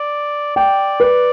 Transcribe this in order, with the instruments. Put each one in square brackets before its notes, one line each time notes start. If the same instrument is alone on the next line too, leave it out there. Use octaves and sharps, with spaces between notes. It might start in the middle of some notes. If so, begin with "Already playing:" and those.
Already playing: [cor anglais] D5
[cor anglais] D5 [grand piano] G5
[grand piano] B4